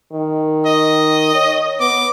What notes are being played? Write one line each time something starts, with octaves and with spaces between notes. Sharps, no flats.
D#3
D#5
C#5
B3 D6